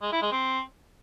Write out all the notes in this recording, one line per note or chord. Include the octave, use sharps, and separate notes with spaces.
G#3
E4
G#3
C4